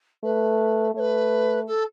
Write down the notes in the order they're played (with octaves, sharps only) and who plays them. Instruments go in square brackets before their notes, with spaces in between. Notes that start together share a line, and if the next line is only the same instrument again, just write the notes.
[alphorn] A3 [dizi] B4
[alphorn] A3 [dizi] C#5
[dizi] B4
A4